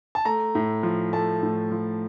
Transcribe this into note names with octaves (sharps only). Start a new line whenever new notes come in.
A5
A3 A#5
A2
F3
A3 A5
A2
F3